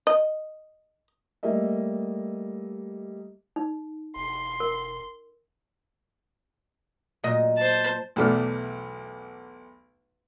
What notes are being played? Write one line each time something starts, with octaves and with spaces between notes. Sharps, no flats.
D#5
G3 A3 A#3 D#5 E5
D#4
E1 C6
A#4
A#2 F#3 D#5
C5 A5
B1 E2 A3 D5 F6